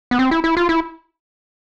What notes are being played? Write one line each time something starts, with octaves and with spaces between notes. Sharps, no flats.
B3
C4
E4
E4
F4
E4